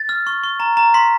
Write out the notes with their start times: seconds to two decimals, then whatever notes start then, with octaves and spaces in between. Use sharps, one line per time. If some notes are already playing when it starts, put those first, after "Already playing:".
Already playing: A6
0.09 F6
0.27 C#6
0.44 C#6
0.60 A#5
0.77 A#5
0.94 C6 B6